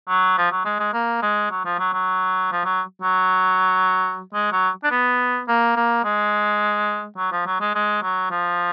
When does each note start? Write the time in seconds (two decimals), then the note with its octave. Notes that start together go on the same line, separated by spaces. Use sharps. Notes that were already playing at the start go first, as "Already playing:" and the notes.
0.08 F#3
0.38 F3
0.51 F#3
0.65 G#3
0.80 G#3
0.93 A#3
1.22 G#3
1.51 F#3
1.65 F3
1.79 F#3
1.93 F#3
2.52 F3
2.65 F#3
3.02 F#3
4.33 G#3
4.52 F#3
4.84 D4
4.91 B3
5.48 A#3
5.76 A#3
6.04 G#3
7.17 F#3
7.32 F3
7.46 F#3
7.61 G#3
7.75 G#3
8.02 F#3
8.31 F3